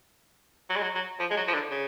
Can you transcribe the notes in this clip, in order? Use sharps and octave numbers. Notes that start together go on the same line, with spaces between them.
F#3
G#3
F#3
F#3
F3
G#3
F#3
F3
D3
C#3